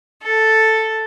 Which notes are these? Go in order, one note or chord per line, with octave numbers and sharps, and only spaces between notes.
A4